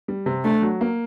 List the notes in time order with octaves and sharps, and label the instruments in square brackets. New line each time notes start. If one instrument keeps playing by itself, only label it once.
[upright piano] G3
C3
[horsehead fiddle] A3 [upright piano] D4
[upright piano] F#3
A#3